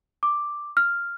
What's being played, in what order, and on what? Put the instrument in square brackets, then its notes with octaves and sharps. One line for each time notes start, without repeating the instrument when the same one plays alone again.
[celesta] D6
F6